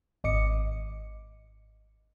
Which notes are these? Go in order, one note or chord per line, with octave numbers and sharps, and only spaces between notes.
G#1 D#5 D6 C#7